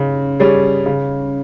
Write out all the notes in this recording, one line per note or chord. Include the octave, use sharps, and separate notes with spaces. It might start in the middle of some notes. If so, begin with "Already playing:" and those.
Already playing: C#3 C#4
G3 C#4 G#4
C#3